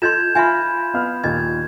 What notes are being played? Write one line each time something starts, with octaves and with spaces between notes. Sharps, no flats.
F4 A4 D#5 C6 G6 G#6 E7
F4 B4 E5 G#5 B5
B3 F5 F6
D#2 A#2 D#5 G#6